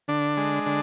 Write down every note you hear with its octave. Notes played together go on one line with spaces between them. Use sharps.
D3 D4
G#3
D3